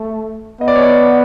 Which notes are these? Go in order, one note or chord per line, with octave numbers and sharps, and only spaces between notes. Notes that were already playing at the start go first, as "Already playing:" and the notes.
Already playing: A3
B3 D#5
D5
C#5
D5